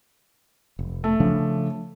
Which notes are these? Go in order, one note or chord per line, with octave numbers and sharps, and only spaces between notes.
F1
A3
C#3 F3 D4